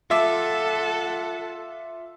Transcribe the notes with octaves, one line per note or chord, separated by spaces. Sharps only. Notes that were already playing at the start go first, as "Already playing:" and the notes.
F4 A4 E5 F#5 D6